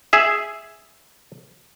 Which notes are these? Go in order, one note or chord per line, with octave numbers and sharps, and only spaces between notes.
G#4 E5